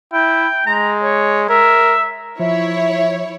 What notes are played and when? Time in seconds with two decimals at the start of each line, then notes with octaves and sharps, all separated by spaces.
0.13 E4 G5
0.67 G#3 A#5
1.03 C#5
1.49 A#4 E5
2.40 F3 E4 C#5 E5